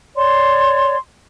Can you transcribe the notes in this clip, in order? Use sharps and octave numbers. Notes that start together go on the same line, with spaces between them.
C#5 D5 C6